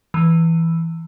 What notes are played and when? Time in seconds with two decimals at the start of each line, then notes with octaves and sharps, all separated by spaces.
0.14 E3